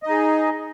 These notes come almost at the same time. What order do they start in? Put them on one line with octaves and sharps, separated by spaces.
D#5 D#4 G#4